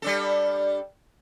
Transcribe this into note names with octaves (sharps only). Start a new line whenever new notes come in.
G3 D4 A4